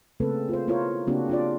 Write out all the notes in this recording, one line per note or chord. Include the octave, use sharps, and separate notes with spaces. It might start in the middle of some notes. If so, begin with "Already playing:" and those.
C#3 A3 A#3 C4 A4 B4
F4 C5
B3 E4 F4 A#4 C5 C#5
C#3 A#3 C4 D4 F#4 G4
D4 F4 D5